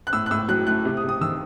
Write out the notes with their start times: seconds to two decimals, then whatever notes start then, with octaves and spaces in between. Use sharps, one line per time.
0.07 F#6
0.13 A2 E6
0.26 F#6
0.31 A2 E6
0.48 F#3 F#6
0.67 A3 F#6
0.85 C3
0.97 D#6
1.03 C3
1.09 D#6
1.21 D#3 E6